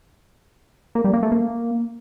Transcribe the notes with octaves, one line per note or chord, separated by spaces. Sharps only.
A#3
G3
A#3
A3
A#3